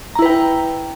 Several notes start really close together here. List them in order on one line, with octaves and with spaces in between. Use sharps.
A#5 E4 B4 G5